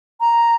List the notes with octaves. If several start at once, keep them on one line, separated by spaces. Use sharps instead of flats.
A#5